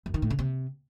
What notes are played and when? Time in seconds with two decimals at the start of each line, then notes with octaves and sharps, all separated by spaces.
0.06 F#2
0.14 D#3
0.22 A2
0.30 C#3
0.39 C3